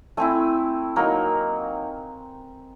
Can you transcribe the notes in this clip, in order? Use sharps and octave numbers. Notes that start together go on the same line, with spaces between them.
A3 C4 E4 G#5
F#3 A#3 D#4